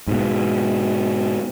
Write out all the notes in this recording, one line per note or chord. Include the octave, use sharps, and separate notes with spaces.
G#2 B2